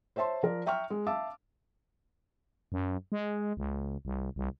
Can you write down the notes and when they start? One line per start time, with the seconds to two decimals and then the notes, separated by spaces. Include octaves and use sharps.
0.16 C5 C#5 E5 A5 C6
0.43 F3 A#4 D5
0.66 E5 G5 A#5 C#6 F6
0.90 G#3
1.07 E5 F5 A5 D6 E6
2.72 F#2
3.12 G#3
3.57 C#2
4.05 C2
4.36 C2